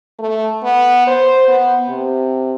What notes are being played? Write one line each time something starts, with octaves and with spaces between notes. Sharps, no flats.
A3
B3
C5
B3
C3